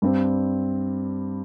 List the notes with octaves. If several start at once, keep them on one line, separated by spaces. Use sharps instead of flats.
G2 G3 C4